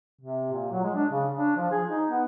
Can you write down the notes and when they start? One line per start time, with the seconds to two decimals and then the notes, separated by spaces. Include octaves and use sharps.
0.21 C3
0.52 A#2
0.72 F#3
0.83 G#3
0.95 D4
1.10 C#3
1.37 D4
1.57 F3
1.71 G#4
1.88 D#4
2.09 B3